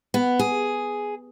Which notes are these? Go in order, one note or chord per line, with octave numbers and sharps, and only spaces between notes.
B3
G#4